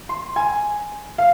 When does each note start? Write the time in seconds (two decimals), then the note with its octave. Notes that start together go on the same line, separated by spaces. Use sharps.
0.09 C6
0.36 G#5
1.18 F5